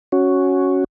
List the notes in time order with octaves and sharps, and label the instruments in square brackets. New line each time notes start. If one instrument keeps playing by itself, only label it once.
[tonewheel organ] C#4 F#4